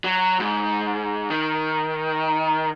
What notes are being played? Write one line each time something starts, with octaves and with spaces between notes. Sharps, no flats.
F#3
G#2
D#3